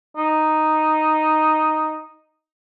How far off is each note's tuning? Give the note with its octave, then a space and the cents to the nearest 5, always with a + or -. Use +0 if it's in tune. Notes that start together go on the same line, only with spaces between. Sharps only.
D#4 +0